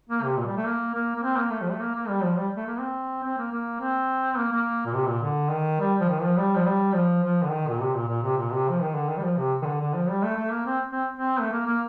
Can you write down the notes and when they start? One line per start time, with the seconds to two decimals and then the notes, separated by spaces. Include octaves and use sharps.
0.09 A#3
0.23 C3
0.37 A#2
0.46 G3
0.57 A3
0.66 A#3
0.94 A#3
1.16 A#3
1.23 C4
1.37 A#3
1.51 A3
1.61 F3
1.71 A3
1.80 A#3
1.95 A#3
2.09 G3
2.23 F3
2.37 G3
2.57 A3
2.66 A#3
2.80 C4
3.23 C4
3.38 A#3
3.51 A#3
3.80 C4
4.38 A#3
4.52 A#3
4.86 A#2
4.94 C3
5.08 A#2
5.22 D3
5.51 D#3
5.80 G3
6.01 F3
6.09 D#3
6.22 F3
6.37 G3
6.55 F3
6.66 G3
6.94 F3
7.23 F3
7.43 D3
7.51 D#3
7.69 A#2
7.80 C3
7.94 A#2
8.08 A#2
8.23 C3
8.38 A#2
8.52 C3
8.69 F3
8.82 D#3
8.95 D3
9.09 D#3
9.18 G3
9.23 F3
9.38 C3
9.62 D#3
9.65 D3
9.80 D3
9.94 F3
10.09 G3
10.23 A3
10.36 A3
10.51 A#3
10.66 C4
10.91 C4
11.17 C4
11.41 A3
11.52 A#3
11.66 A#3